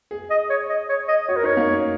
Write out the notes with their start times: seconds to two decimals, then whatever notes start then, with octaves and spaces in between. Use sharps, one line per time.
0.11 G#4
0.31 D#5
0.50 C#5
0.70 D#5
0.89 C#5
1.08 D#5
1.28 F#4 C#5
1.36 A#4
1.43 D#4 C#5
1.57 A#3
1.72 C#4